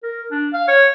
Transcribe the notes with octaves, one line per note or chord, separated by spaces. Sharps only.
A#4
D4
F5
C#5